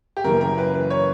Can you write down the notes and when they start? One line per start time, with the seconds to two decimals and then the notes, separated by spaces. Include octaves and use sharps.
0.17 G4
0.24 F#2 C#3 E3 A#3 A#4
0.41 A#4
0.58 B4
0.74 B4
0.90 C#5